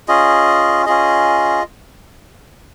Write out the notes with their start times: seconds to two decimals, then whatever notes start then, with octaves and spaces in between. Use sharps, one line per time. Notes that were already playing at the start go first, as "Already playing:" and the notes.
0.08 C#4 F4 G#4 D#5
0.86 C#4 F4 G#4 D#5